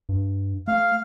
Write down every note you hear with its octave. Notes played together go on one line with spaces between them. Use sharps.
G2
A3 F5